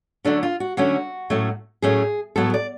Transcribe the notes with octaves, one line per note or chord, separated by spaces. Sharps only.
D3 F#3 A3 C#4 D4
F4
F#4
D3 F#3 A3 C#4 F#4
A2 F#3 A3 C#4
A2 F#3 A3 C#4 G#4
A2 F#3 B3 A4
D5